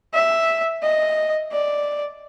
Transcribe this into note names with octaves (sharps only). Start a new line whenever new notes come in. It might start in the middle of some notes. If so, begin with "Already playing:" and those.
E5
D#5
D5